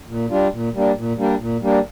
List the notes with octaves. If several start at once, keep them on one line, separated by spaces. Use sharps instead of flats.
A#2
G3 D4 F4
A#2
G3 A#3 D4
A#2
G3 A#3 D4
A#2
G3 A#3 D4